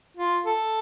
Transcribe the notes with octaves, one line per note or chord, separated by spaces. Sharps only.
F4
A4